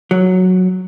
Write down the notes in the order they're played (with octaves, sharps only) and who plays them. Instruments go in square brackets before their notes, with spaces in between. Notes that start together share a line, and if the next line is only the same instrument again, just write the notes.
[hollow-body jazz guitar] F#3